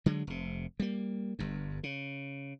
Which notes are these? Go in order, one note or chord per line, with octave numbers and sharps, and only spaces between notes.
D3 F#3 G#3
F1 C3
G3 A#3
G1 G2
C#3